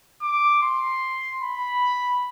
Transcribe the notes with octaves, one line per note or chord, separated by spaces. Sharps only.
D6
C6
B5